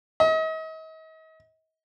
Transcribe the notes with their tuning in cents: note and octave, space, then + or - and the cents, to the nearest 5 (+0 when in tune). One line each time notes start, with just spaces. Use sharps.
D#5 +40